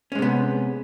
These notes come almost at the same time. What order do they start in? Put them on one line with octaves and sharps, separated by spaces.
C#4 G#3 C3 B3